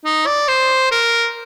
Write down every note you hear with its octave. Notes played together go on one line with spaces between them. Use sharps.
D#4
D5
C5
A#4